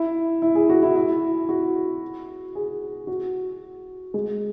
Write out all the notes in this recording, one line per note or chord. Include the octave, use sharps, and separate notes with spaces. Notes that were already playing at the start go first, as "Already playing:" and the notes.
Already playing: E4
E4
G#4
F#4
E4
E4
F#4
G#4
F#4
G#3